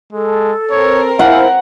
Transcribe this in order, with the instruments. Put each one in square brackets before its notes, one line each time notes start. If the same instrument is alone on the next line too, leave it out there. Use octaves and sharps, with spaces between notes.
[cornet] G#3 [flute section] A4
[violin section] C4 A#4 [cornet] C#5
[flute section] E4 C5 G#5 [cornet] F5 [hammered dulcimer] F#5